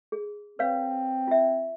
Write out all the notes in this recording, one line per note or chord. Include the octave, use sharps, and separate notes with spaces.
G#4
C4 B4 C#5 F5
F4 E5